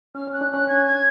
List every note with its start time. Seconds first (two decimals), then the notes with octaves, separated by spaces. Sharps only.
0.14 C#4 F6
0.27 C#4
0.32 F#6
0.41 D4
0.50 C#4 F#6
0.67 C#4 G#6
0.86 G#6